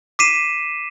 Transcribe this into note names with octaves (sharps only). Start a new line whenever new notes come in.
D6 B6 C7 D#7 E7